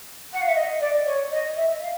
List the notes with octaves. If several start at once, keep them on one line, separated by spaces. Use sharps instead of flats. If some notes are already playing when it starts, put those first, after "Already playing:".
F#5
F5
E5
D#5
D5
C#5
D#5
E5
F5